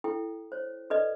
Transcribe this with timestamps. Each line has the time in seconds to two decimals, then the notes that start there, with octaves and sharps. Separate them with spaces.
0.04 E4 A4 G5
0.52 C5 C#5
0.90 A4 B4 D5 D#5